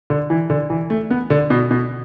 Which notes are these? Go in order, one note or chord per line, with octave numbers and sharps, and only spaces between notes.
D3
E3
D3
E3
A3
B3
D3
B2
B2